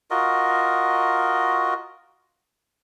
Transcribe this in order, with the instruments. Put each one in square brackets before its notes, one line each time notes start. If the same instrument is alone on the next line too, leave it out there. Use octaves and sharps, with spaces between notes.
[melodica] F4 F#4 A#4 D#5